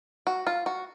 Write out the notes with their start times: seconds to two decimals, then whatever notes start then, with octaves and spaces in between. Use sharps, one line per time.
0.27 F#4
0.47 F4
0.66 F#4